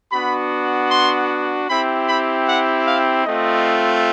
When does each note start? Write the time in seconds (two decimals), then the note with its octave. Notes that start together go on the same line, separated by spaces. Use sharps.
0.12 B3 D4 F#4 B5
0.91 C6
1.68 C4 E4 G4 B5
2.08 B5
2.47 F#5
2.87 F5
3.26 A3 C4 F4 D#5